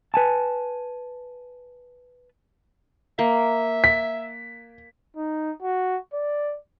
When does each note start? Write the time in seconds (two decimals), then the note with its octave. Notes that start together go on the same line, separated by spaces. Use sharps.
0.14 B4 G#5 A5
3.19 A#3 E5
3.84 B6
5.17 D#4
5.63 F#4
6.13 D5